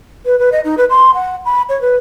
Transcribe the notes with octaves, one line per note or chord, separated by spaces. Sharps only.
B4
B4
D#5
D#4
B4
C6
F#5
B5
C#5
B4